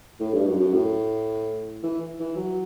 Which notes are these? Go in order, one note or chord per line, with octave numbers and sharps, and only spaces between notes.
A2
G2
F#2
F#2
A2
E3
E3
F#3